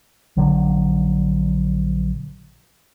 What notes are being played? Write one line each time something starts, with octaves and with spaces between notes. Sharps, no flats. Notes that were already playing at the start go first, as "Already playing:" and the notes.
A#1 D3 F#3